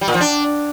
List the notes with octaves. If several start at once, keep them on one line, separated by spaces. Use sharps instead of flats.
G3
A#2
F3
D4